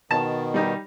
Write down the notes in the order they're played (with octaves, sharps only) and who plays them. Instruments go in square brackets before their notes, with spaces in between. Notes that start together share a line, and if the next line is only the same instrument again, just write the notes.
[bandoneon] B2 D#3 [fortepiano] A5
[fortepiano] G3 D#4 G4